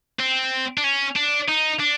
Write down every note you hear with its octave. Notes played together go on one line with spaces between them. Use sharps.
C4
D4
C#4
D4
D#4
D4